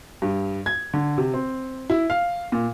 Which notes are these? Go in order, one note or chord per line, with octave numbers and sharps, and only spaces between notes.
G2
G#6
D3
C3
C4
E4
F5
A#2